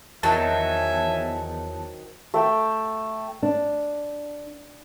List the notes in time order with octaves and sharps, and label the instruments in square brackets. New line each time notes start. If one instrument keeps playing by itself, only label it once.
[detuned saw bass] E2 [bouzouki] D#3 F#3 C4 [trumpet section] E5 G#5 [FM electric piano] A5
[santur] A3 G5
[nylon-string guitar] D4